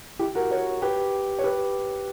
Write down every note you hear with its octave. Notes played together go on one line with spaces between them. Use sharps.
E4 G4
F#4 A#4
A#4 C#5
G4 B4
C#5
G4 B4